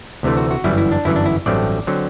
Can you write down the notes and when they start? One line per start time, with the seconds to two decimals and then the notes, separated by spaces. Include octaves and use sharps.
0.23 D2 C3 E3 A3
0.37 F#4
0.51 F#4
0.64 G1 F#2 E3 G3 E4
0.78 E4
0.92 D4
1.05 G1 F#2 E3 E4
1.16 D4
1.26 E4
1.46 A1 G2 F#3 A3 C4 D5
1.87 D3 F#3 C4